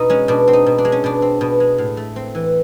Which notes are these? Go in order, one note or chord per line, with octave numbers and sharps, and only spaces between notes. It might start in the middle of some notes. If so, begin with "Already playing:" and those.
Already playing: B2 D#4
G#3 C#4
B2 D4
C4
D#4
B2
D4
G#3
C#4
B2 D4
C4
B2
G#3
A2
A3
C4
E3